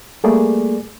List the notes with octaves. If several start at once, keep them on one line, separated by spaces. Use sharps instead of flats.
G3 A3 A#3 G#4 D5